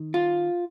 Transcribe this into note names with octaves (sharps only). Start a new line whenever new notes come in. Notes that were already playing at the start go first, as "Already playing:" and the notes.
Already playing: D#3
F4